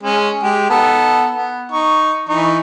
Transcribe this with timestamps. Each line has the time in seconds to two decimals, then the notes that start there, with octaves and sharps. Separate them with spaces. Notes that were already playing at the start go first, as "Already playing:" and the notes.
0.03 G#3 C#4
0.43 G#3 G4
0.70 B3 D#4 A4
1.34 B3
1.72 D#4 C#6
2.29 E3 D#4 C#6